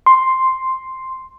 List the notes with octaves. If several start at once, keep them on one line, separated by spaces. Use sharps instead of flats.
C6